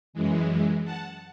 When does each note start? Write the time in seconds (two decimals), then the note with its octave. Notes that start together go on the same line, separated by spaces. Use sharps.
0.13 F#2 E3 G#3
0.85 F#5 A5